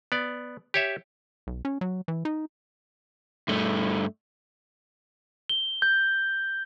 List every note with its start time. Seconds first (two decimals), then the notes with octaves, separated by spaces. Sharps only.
0.12 B3 D5
0.74 G4 C#5 E5
1.47 B1
1.65 C#4
1.81 F#3
2.08 E3
2.25 D#4
3.48 G2 A3
5.49 G7
5.82 G6